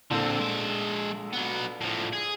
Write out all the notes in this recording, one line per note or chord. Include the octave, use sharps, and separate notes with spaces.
A#1 D3 C4 A4
G#3 E5
F#3 B3
A2 F3
G#4